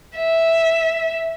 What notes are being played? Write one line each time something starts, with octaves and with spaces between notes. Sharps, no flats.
E5